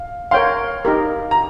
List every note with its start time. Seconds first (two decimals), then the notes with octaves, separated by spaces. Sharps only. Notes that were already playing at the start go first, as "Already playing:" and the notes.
Already playing: F5
0.31 A#4 C#5 F5 G5 C6
0.85 D#4 G4 A#4
1.31 A#5